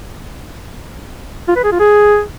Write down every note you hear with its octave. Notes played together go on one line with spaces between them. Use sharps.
F4
B4
G#4
F4
G#4